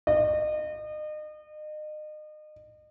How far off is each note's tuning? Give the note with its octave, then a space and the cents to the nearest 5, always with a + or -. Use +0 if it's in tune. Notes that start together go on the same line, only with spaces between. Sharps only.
D#5 -35